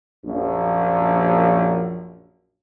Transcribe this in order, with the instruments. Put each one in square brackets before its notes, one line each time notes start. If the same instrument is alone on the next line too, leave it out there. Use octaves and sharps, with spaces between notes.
[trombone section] A#1 F#2